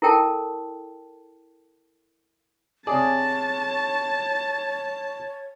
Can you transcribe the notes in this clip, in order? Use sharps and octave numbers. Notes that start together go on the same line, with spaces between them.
E4 A4 A#4 G5 A5
C3 G#4 C#5 D5 A5